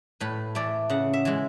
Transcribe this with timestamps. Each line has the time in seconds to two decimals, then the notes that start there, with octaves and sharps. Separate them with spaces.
0.20 A2 B4
0.55 E3 A3 D5
0.90 C#3 F#5
1.13 E5
1.25 E3 G#3